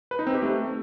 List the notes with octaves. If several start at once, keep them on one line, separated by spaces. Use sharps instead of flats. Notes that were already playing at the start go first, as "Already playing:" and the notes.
B4
D#4
C4
G4
A3